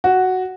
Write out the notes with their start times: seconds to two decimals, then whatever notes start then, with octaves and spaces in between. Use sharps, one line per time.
0.04 F#4